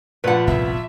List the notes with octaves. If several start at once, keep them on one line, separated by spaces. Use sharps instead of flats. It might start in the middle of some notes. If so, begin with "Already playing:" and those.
A#1 F3 B4 F#5
G1 C2 A2 E5